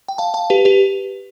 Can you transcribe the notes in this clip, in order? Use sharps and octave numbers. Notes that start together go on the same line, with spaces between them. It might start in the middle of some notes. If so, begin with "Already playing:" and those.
G5
F5 A5
F5 A5
G4 B4
G4 B4